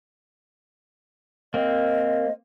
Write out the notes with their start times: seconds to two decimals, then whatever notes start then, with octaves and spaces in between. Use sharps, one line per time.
1.54 A#3 C4 D#5